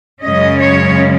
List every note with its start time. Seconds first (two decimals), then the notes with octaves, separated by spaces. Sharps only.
0.22 F#2 C#3 G#3 C#4 D#5
0.59 C#5